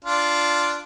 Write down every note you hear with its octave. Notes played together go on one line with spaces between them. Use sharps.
D4 F4